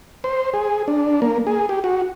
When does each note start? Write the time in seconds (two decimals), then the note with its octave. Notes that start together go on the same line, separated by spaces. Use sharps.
0.24 C5
0.54 G#4
0.88 D4
1.22 A#3
1.47 G#4
1.69 G4
1.84 F#4